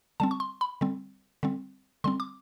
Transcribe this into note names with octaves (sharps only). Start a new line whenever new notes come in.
D3 G3 C4 A5
C#6
C6
B5
D3 G3 C4
D3 G3 C4
D3 G3 C4 C6
D6